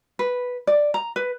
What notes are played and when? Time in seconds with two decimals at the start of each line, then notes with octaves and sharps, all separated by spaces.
0.19 B4
0.67 D5
0.94 A#5
1.16 B4